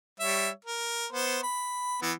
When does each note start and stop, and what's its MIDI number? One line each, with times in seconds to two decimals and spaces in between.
0.20 0.50 55
0.20 0.50 73
0.20 0.50 76
0.65 1.06 70
1.12 1.39 59
1.12 1.39 72
1.43 1.98 83
2.02 2.12 52
2.02 2.12 59